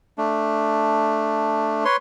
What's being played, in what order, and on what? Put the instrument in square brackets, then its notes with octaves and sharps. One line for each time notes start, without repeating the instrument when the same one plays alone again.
[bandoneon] A3 D4
B4 C#5 C6